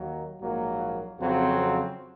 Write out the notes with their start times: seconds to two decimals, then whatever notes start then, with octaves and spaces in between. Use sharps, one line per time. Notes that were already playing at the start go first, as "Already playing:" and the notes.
Already playing: D#2 D#3 F#3 A#3
0.40 A#1 G#2 F#3 A#3
1.18 F2 C#3 F#3 C4